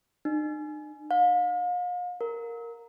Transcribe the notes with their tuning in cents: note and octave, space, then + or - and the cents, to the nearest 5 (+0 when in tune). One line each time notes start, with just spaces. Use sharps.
D#4 -45
F5 +40
A#4 -5